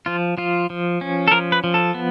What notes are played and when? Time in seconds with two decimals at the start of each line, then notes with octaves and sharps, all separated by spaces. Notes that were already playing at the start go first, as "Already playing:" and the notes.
0.06 F3 F4
0.37 F3 F4
0.70 F3
1.01 C#4
1.28 A4
1.32 F3 A#4
1.52 B4
1.64 F3
1.74 A4
1.94 B3